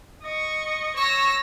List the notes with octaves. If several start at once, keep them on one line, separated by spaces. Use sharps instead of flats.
D#5 C#6
C#5 C#6 E6 A#6